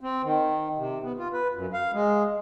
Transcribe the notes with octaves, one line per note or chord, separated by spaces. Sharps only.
C4
D#3
C3
B3
F4
B4
F#2
F5
G#3